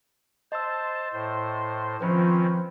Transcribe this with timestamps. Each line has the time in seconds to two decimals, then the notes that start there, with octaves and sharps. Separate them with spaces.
0.52 C5 D#5 A5 E6
1.13 A2 C5
2.01 D#3 F3 C4 C#4 B4 C5 B5